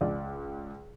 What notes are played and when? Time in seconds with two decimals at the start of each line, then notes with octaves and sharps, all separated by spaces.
0.01 C#2 D5